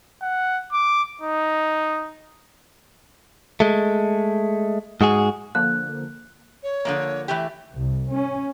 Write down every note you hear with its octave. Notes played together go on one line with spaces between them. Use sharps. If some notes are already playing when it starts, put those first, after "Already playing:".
F#5
D6
D#4
G#3 A3
G#2 G#3 F#4 G#4
D3 F3 A#3 F#6
C#5
D3 F3 A#3
E3 A3 G4
C2
C#4